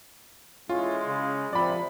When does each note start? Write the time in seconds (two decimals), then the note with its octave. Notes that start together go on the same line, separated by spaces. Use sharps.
0.69 A1 G#3 C#4 E4 F4
1.07 C#3
1.53 A#1 C3 F3 D5 B5